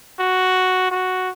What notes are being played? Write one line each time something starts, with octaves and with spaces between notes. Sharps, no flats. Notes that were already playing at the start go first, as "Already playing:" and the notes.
F#4
F#4